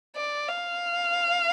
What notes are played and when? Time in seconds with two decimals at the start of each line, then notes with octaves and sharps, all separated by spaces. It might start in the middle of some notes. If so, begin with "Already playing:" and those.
0.16 D5
0.49 F5